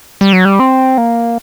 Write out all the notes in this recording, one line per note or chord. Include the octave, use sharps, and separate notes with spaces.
G3
F#3
G3
C4
A#3